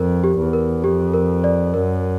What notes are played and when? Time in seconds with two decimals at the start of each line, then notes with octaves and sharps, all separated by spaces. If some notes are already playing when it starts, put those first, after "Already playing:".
Already playing: F2 A#4
0.24 G4
0.38 E2
0.53 A#4
0.83 F2 G4
1.14 A#4
1.44 D5
1.74 F#2 A#4